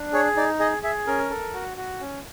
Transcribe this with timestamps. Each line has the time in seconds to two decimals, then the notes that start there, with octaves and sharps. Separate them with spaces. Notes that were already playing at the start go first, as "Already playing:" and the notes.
Already playing: D4
0.13 G#4 C#5
0.36 D#4 D5
0.59 G#4 D#5
0.83 G#4 E5
1.07 C#4 A#4
1.31 A4
1.54 F#4
1.77 F#4
2.00 C#4